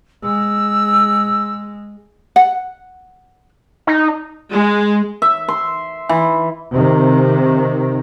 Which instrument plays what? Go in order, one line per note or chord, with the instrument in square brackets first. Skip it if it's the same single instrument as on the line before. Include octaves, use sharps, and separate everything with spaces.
[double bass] G#3 [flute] E6
[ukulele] F#5
[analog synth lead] D#4
[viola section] G#3
[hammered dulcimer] E5
C6
E3
[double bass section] C3 D#3